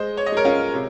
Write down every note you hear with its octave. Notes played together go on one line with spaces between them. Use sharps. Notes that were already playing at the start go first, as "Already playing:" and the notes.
Already playing: G#3 C5 D#5
C#5
D#5
G#3 A#4 C#5
C#4 F4
C3